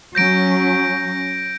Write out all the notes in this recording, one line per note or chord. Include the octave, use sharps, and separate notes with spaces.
F#3 C#4 G6 A#6 D7